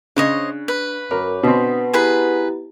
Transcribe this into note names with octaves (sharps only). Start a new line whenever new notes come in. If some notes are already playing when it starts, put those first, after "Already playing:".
C#3 D4 C5 C#5 D#5 F#6
B4
F#2 A#4 C#5 B5 D6
B2 B3 C4 D4 D#6 B6
E4 G4 G#4 B4 A#5 B5